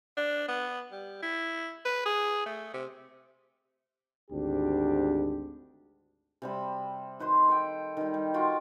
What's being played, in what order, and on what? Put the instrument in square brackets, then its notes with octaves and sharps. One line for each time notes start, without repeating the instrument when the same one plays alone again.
[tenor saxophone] D4
B3
G3
E4
B4
G#4
A3
C3
[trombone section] G#1 D2 D4 G4
[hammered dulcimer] C3 G3 B5
D#3 B4 C5 C6
A4 G5
D#3 G3
G3
F4 F#4 G5